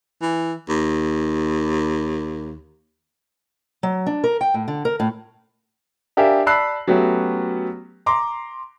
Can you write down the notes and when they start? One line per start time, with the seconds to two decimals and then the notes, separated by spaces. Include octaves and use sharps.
0.21 E3
0.69 D#2
3.83 F#3
4.06 D4
4.24 A#4
4.41 G5
4.54 A2
4.68 D3
4.85 A#4
5.00 A2
6.17 D4 G4 A#4 E5 F5 G#5
6.46 D5 A5 B5 E6 F#6 C7
6.87 F#3 A3 B3 C#4 F#4 G4
8.06 A#5 C6 D6